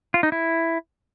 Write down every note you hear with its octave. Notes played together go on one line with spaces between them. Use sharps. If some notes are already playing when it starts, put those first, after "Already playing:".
F4
D#4
E4